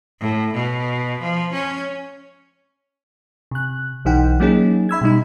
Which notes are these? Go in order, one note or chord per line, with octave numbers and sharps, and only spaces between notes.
A2
B2
F3
C#4
C3 F#6
B1 E3 D#4 F#5 G5
F#3 A#3 C#4 D#4 G#4
E5 B5 E6 G#6
B2 G3 D#4